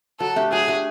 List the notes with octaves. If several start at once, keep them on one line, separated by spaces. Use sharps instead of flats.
F#3 A4
A3 D4 G4
F#3 G#4
A3 D4 G4